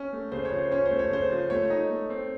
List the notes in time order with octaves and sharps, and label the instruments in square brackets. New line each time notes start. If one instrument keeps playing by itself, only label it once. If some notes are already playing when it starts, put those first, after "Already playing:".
Already playing: [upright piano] C#4
A3
[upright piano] C#3 [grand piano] C5
[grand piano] C#5
[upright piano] F3
[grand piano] C5
[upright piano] C#4 [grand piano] C#5
[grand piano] C5
[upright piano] A3
[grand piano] C#5
[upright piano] C#3 [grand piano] C5
[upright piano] F3
[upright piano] A3 [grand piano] C#5
[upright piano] D#4
A3
C4